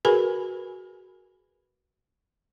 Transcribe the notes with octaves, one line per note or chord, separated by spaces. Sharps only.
F#4 G#4 A#4 B4 G#5 B5